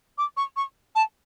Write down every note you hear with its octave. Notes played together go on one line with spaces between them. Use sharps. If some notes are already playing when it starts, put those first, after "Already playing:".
D6
C#6
C#6
A5